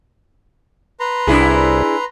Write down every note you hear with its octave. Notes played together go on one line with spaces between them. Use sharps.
B4 A#5 C6
C2 D4 E4 G#4